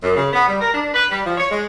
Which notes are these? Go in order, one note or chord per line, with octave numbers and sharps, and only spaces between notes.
F#2
C#3
B3
G3
A#4
D4
B4
G3
F3
C#5
G#3